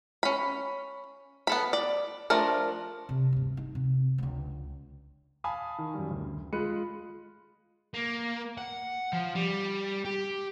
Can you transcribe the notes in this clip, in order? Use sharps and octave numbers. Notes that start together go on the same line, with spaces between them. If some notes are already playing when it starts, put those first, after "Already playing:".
C#4 B5
B3 A4 B5
D5
F3 A3 D4 A#4
C3
D2 G2
D#4
C3
C#2 D3
F5 G#5 A5 B5 D#6
D#3
F#2 G3
D2
G#3 F4 B5 F#6 C#7 D#7
A#3
F#5
F3
G3
G4